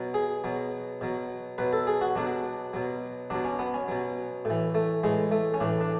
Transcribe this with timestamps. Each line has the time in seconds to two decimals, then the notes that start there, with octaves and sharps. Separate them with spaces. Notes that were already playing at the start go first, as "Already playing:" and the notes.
Already playing: B2 F#3
0.14 G#4
0.44 B2 F#3
1.01 B2 F#3
1.58 B2 F#3 B4
1.73 A4
1.87 G#4
2.01 F#4
2.16 B2 F#3 D4
2.73 B2 F#3
3.30 B2 F#3 D4
3.45 C#4
3.59 B3
3.74 C#4
3.88 B2 F#3
4.45 A2
4.50 E3
4.75 A3
5.03 A2 E3 G#3
5.31 A3
5.54 C#4
5.60 A2 E3 D4
5.81 D4